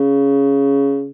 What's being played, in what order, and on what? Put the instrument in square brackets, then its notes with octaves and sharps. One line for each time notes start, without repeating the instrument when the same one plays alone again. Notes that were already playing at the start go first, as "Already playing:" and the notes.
Already playing: [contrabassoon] C#3